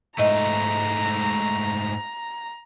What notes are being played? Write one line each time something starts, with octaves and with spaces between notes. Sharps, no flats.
G#2 A3 D#5 A#5